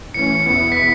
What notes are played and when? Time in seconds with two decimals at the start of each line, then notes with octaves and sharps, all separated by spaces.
0.14 A2 E3 C#4 C#7
0.35 C#7
0.46 E2 B2 B3 E4 C#7
0.72 B6
0.77 C#7